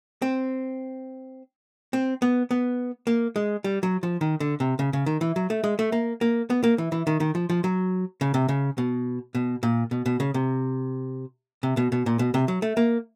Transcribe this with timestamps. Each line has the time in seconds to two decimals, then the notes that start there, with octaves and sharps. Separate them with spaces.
0.22 C4
1.93 C4
2.22 B3
2.51 B3
3.07 A#3
3.36 G#3
3.64 G3
3.83 F#3
4.03 F3
4.21 D#3
4.40 D3
4.60 C3
4.79 C#3
4.93 C#3
5.06 D#3
5.21 E3
5.36 F#3
5.50 A3
5.64 G#3
5.79 A3
5.92 A#3
6.21 A#3
6.50 B3
6.64 A#3
6.78 E3
6.92 E3
7.07 D#3
7.20 D#3
7.35 F3
7.50 F3
7.64 F#3
8.21 C#3
8.34 C3
8.49 C#3
8.78 B2
9.35 B2
9.63 A#2
9.91 B2
10.06 B2
10.20 C#3
10.34 C3
11.63 C3
11.77 B2
11.92 B2
12.06 A#2
12.19 B2
12.34 C3
12.48 F#3
12.62 A3
12.77 A#3